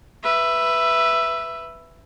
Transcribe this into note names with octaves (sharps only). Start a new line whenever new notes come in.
B4 E5